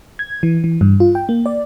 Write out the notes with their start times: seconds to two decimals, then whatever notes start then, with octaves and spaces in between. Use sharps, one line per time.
0.19 G#6
0.43 E3
0.64 E3
0.81 G2
1.00 F4
1.15 G5
1.29 A#3
1.46 D5